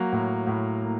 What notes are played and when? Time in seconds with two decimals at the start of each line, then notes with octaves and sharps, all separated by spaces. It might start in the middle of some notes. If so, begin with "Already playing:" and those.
Already playing: F#3 A#3
0.12 A2
0.47 A2
0.82 A#3